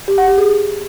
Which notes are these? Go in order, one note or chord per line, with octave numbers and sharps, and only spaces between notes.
G4
F#5
G4
G#4